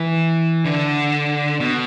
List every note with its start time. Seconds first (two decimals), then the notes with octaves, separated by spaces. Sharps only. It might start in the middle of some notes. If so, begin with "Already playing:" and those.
Already playing: E3
0.65 D3
1.60 B2